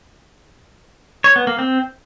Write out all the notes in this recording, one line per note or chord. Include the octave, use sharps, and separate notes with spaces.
C#5
B3
A#3
C4